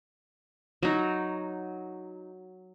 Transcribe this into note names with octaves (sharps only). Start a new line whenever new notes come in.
F#3 D#4